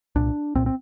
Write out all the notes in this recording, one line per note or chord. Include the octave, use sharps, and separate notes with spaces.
C2 A#2 D4
C2 A#2 C4
C4